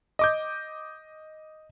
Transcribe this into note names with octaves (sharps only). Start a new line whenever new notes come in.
D#5 D6 G6